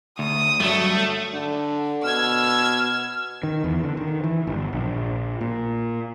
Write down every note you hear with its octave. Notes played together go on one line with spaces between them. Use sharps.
D2 D#6
G2 F#3 G3 A3
D3
B2 E6 F6 G#6
D#3
E2
D3
D#3
E3
G1
A#1
A#2